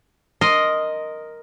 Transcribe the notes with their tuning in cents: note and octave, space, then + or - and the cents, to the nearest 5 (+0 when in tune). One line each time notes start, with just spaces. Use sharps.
A#4 +0 D#5 +0 C6 +0